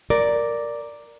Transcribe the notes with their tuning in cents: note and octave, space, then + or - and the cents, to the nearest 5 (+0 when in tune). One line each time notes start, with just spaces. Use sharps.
A#4 +0 D5 +0